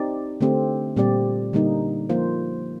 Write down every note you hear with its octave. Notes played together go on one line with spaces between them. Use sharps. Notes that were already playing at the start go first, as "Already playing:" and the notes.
Already playing: C4 D#4 G4 D5
D3 A3 C4 G4
A#2 G3 C4 G4 D5
D3 G3 A#3 D#4
F3 A#3 F4 C5